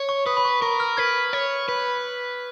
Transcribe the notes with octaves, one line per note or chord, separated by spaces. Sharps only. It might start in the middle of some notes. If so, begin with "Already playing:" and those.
Already playing: C#5
C#6
B4 D#6
B5
C#6
A#4 C#6
F6
B4 G#6
C#5
B4